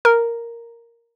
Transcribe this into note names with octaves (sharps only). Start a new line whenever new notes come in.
A#4